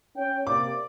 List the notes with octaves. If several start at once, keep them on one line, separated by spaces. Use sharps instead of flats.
C#4 C#5 G5
C3 A#3 D5 D6